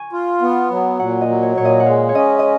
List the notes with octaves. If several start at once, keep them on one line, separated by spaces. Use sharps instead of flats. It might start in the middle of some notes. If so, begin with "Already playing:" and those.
Already playing: G#5 C#6
F4
B3
F#3
A#2 F#5
D#5
F#3
C#5
A#2 C#5
D#5
F#5
G#3 F5
C#5
C#4 D#5
D#5